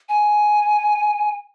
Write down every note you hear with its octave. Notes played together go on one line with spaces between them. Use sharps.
G#5